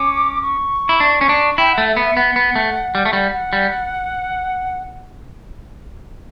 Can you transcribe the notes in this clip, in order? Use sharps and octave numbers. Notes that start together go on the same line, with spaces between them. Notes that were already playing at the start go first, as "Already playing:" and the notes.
Already playing: C#4 D6
C#6
E4
D4
C#4
D4
E4 G5
F#5
A3
E5
B3
E5
B3 F#5
B3
A3
G3
A3
G3
F#5
G3